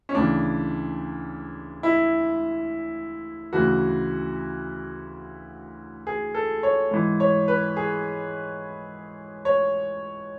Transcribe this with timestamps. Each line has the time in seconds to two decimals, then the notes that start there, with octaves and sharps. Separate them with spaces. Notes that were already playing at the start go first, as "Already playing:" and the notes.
0.09 C#4
0.14 D2 C#3 E3 D4
1.83 E4
3.53 D2 C#3 E3 F#4
6.07 G#4
6.34 A4
6.63 C#5
6.91 G#2 E3
7.20 C#5
7.48 B4
7.76 G#4
9.45 C#5